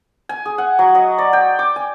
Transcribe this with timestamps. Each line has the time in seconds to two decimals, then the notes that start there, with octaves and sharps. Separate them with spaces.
0.29 G#5
0.46 G#4
0.58 F#5
0.79 F#3
0.95 D#5
1.18 D5
1.33 G5
1.59 D6
1.76 G#5